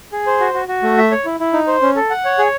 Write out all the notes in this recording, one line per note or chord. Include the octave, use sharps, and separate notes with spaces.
G#4
C5
F#4
F#4
F#4
A3
E5
C#5
E4
E4
D#4
C5
C#4
A4
F#5
C#5
G#4